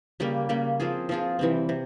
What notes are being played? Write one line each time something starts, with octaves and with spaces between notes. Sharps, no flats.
C#3 G3 A#3
C#3 G3 A#3
F3 C4 F4 G#4
F3 C4 F4 G#4
C3 E3 G3 C4
C3